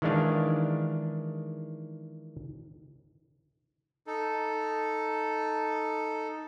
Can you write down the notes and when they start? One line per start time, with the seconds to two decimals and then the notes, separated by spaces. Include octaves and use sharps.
0.02 D#3 E3 G#3 D4 F5
4.07 D#4 A4